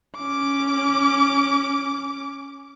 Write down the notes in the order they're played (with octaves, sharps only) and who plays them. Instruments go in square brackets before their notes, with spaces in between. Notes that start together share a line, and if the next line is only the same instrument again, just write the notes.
[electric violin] C#4 D6